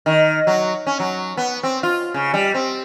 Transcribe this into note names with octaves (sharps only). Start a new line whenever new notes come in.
D#3
F#3
C#4
F#3
B3
C4
F4
C#3
G3
C4